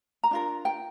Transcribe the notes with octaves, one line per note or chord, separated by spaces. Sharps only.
A#5
D4 F4 A#4
G5